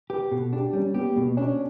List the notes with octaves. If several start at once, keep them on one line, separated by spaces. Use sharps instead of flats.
G4 B4
B2 A4
D4 G4
G3 C#4
B3 G4
B2 B3
C#4 D4